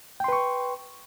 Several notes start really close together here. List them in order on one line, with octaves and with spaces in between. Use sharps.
G5 C6 B4 C#6